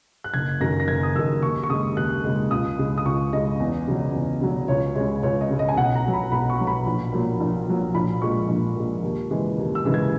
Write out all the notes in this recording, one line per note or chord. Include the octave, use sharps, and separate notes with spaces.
F#6
F#1 G#6
F#2 D#3 A#6
A#6
F#1 G#6
D#6
F#2 D#3 E6
D#2 C#6
C#6
C#3 G#3 D#6
D#2 F#6
C#3 G#3
C#2 D#6
C#3 G#3
D#6
C#2 C#6
C#3 G#3 D#5
E2
C#3 F#3
E2
C#3 F#3
C#2 C#5
C#3 G#3 C#5
C#2 C#5
D#5
C#3 G#3
D#5
G#5
B1 F#5
A#5
B2 F#3
B5
B1 B5
C#6
B2 F#3
B5
A#1
A#2 F#3
A#1
A#2 F#3
A#1 B5
A#2 G#3 C#6
A#1
A#2 G#3
D#2
C#3 E3 G#3
D#2
E6
C#3 E3 G#3
G#6